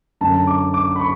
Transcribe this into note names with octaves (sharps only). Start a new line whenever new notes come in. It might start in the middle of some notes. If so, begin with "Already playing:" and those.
F#2 D3 A5
D6
D6
B5
C#6